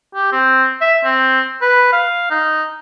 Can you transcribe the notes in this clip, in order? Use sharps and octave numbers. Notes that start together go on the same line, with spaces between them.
G4
C4
E5
C4
B4
F5
D#4